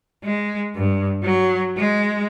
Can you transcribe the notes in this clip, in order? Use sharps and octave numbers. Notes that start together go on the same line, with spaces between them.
G#3
G2
F#3
G#3